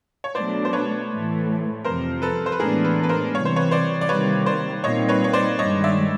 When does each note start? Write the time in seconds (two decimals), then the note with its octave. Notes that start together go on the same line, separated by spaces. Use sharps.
0.24 C#5
0.35 B2 F#3 A3 D4 C5 D5
0.65 C5
0.73 B4 C#5
1.10 A2 E3 A3
1.85 F2 C3 F3 A#4 C5
2.22 A4 B4
2.46 C5
2.52 B4
2.60 A2 E3 G#3 B3 D4 G#4 A#4
2.84 A4 B4
3.03 B4
3.09 A#4 C5
3.35 C3 E3 G3 C#5
3.45 C5
3.56 B4 C#5
3.71 C5 D5
4.01 D5
4.09 C3 D#3 G3 A#3 B4 C#5
4.46 C5 D5
4.83 A#2 G3 C4 D#4 C#5 D#5
5.09 B4 C#5
5.24 C#5
5.33 C5 D5
5.58 G2 D#3 G#3 C#5 D#5
5.84 D5 E5